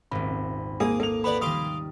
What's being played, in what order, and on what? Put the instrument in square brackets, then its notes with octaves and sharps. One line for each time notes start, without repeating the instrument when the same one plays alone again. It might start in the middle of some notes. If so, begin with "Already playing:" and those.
[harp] D#1 G#1 [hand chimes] B5
[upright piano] A#3 G#4 [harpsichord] D#6
[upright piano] A#3 F7 [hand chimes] A4
[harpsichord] B3 B4 D5 [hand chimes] B5
[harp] D#3 G3 [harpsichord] F5 C6 D6 [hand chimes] D#6